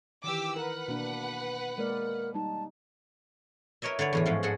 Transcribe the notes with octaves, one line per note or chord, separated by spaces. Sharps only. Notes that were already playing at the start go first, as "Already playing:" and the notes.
D#3 E3 G4 D6 E6
A#4 B4 F#5
B2 A#3 D4
G#3 A#3 A#4 D5
G3 D#4 A5
E4 A#4 B4 C#5 D#5 E5
D3 B4 C#5 D5
E2 A2 E3
G#2 F3 C#4
G#2 F#4 G#4 A4 F#5